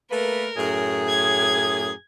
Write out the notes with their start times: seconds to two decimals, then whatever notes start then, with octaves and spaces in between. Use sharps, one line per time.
0.11 A3 A#3 A#4 B4
0.57 F#2 A2 G#4
1.09 G#6